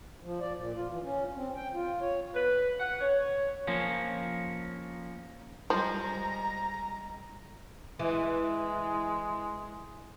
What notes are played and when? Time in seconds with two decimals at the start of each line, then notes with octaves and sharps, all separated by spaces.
0.22 F3
0.41 D5
0.57 A#2
0.74 F4
0.89 E3
1.03 C#4
1.35 C4
1.55 G5
1.73 F4
2.01 C#5
2.35 B4
2.80 F#5
3.01 C#5
3.67 F3 A#3 C#4
5.70 F3 G3 G#3 A#5
7.99 E3 G#3